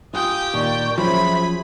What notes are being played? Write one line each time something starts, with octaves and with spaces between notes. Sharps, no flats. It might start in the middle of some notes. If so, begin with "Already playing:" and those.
F4 G4 G5 G#5 D#6
D#2 A#2 D#3 D5 C#6
F3 F#3 C#4 G#4 C5 E5 B5